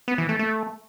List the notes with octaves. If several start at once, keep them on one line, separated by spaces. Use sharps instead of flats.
B3
E3
A3
A3